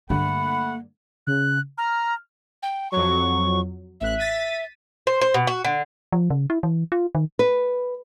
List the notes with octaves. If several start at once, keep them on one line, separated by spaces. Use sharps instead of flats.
G2 D3 A3 A#3 F#5 B5
C#3 F#6
A#5 F6
G5
F2 F#3 C#6
A1 E5 F#6
A6 B6 D#7
C5
C5
B2
F#4
D3
F3
C#3
E4
E3
F4
D#3
B4